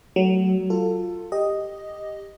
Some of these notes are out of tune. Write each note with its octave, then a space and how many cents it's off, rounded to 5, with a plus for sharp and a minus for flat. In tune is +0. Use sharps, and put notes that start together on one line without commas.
F#3 +20 A3 +5
F4 +10 A4 +20
G4 +10 D#5 +0